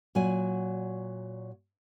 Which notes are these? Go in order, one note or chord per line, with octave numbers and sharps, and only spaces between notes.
A#2 F#3 F4 F#4 G#5